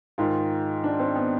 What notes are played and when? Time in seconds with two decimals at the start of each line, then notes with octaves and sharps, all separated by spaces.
0.18 G#2 D#3 F4
0.84 D4
0.99 C4
1.16 B3